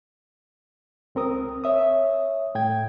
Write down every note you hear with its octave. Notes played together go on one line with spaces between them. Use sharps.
C#2 C4 A#4 D#6
C#5 E5 D#6
A2 G5 G#6